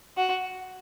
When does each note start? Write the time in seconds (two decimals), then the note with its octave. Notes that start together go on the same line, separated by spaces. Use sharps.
0.17 F#4